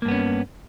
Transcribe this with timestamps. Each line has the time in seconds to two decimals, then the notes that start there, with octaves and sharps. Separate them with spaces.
0.02 A#3
0.05 G2
0.08 B3
0.11 C#4